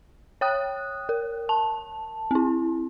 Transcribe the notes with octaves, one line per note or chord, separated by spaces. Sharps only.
C#5 G5 D#6 F#6
A#4
A5
C4 E4